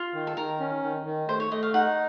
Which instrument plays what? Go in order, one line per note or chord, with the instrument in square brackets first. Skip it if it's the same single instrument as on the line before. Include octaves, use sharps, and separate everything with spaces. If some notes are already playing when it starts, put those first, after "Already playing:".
Already playing: [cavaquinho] F4
[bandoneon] D#3
[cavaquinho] A4
[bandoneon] D#3 [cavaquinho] A#4
[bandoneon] C#4
D#3
D#3
[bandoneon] A3 [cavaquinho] C5
[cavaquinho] C#5
[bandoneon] A3 [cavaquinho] D#5
[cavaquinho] F5
[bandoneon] D#4 [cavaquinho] F#5